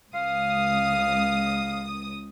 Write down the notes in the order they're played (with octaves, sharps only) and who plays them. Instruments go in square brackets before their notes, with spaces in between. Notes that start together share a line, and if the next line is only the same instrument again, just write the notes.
[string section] C#2 D#6 [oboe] F5